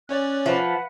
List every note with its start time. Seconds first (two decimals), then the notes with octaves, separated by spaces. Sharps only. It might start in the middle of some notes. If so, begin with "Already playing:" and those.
0.09 C#4 C#5 D5 F#6
0.46 F3 B4 F#5 F#6